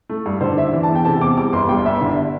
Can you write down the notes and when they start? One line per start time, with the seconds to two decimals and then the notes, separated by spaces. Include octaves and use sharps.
0.09 A3
0.26 G2
0.41 D3 C5
0.57 D4 E5
0.73 E3
0.83 A5
0.89 E2
0.95 G5
1.05 C3 A5
1.21 E2 D6
1.37 G3 D6
1.53 G1 C6
1.69 G2 G5
1.85 G1 E5
2.01 D3